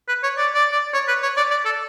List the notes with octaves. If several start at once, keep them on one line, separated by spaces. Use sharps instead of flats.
B4
C#5
D5
D5
D5
C#5
B4
C#5
D5
D5
A4